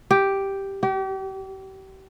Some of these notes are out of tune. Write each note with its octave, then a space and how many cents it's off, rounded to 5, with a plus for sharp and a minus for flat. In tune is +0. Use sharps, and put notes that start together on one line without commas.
G4 +0
G4 -35